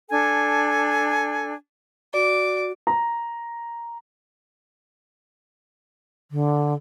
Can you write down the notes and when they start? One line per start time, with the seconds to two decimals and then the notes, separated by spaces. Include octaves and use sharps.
0.10 D4 A4 G#5
2.14 F#4 D5 D6
2.87 A#5
6.31 D3